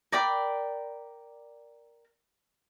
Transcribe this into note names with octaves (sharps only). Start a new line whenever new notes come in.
A#4 D5 G5 B5